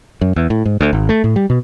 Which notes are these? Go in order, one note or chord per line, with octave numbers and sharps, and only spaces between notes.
F#2
E2
A2
G#2
D2
G#1
A3
A2
G3
B2